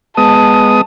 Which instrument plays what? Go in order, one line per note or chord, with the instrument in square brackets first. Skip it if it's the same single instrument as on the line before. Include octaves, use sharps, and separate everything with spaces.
[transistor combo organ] G#3 B3 D#6 [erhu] A5